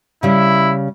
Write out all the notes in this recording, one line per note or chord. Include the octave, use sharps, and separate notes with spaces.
C#3 G3 E4